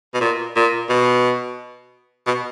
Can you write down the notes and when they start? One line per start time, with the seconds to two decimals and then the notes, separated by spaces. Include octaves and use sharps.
0.14 B2
0.20 A#2
0.56 A#2
0.89 B2
2.26 B2